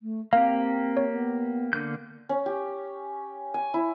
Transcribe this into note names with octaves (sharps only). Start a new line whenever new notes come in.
A3
A#3 C4 G4 F5
C#5
B3
D3 A#3 D4 G6
C#4
G4
G#5
E4